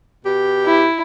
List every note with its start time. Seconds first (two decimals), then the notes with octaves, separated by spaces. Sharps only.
0.25 B2 G4
0.65 E4